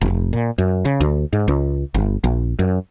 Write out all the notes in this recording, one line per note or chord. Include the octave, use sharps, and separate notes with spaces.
F1
A#2
F#2
C#3
D2
G#2
C#2
G1
A#1
F#2